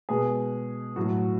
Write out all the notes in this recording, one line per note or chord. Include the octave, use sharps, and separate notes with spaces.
B2 G#3 G#4
A2 F#3 F#4